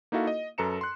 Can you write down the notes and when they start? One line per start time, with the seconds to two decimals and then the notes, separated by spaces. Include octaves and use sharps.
0.12 A#3 D#4 E4 F#4 A4 F5
0.27 D#5
0.58 F#2 A4 B4 A#5 C#7 E7
0.81 C6 F#6